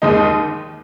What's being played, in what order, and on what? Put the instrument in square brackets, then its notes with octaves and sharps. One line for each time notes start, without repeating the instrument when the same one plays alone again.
[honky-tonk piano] D#2 D#3 G#3 D#4